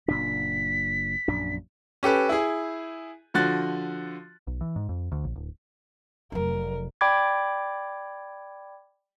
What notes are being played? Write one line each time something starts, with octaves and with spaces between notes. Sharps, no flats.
F#1 A#2 D4 B6
A#1 F#2 D4
C#4 G4 A4 B4
E4 G#4
D3 F3 F#4 F#6 A6
B1
E3
G#2
F2
D2
A#1
D1
F1 F#3 A#4
D5 G5 B5 D6 G#6